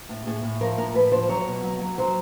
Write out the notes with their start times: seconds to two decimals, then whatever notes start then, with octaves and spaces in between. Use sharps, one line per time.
0.09 A2
0.26 A2 G#4
0.43 A2
0.61 F3 A#4
0.78 A2 A#4
0.94 A2 B4
1.12 F3 C5
1.29 F#3 C#5
1.47 B2
1.64 F#3
1.81 F#3
1.98 F#3 C5